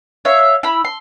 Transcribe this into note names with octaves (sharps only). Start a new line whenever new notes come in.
C#5 E5 F5
E4 B5
C6